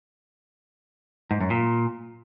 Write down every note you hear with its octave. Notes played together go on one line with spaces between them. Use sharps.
G#2
F#2
A#2